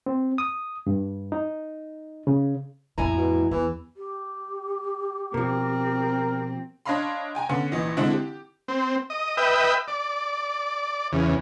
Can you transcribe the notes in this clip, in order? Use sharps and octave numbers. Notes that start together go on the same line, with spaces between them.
C4
D#6
G2
D#4
C#3
F2 A2 E4 G#5 A#5
B2
E2 E3
G4
B2 F3 C4 A#4
D4 C#5 D#5 F5 B5 C6
G5 G#5 A#5
D3 B3 C#4
A#1 E3 D#5
D3 G#3 C4 D4 E4
G4
C4
D#5
B4 D#5 E5 G5
D5
E2 C#3